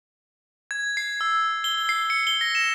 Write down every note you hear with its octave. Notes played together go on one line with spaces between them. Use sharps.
G#6
C7
E6
G7
C7
C#7
G7
A#6
E7